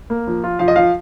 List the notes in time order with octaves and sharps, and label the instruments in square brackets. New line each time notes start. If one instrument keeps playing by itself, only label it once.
[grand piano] A#3
F3
F4
[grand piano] F3 [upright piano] F5
[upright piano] D#5
[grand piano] F3 [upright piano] F5